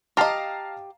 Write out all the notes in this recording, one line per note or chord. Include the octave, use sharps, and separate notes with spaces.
G4 D#5 F5 A5 A#5